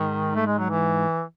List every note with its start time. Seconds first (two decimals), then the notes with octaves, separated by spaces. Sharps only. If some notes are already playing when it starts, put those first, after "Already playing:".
Already playing: G#2 D#3
0.35 A3
0.47 G#3
0.58 F#3
0.70 E3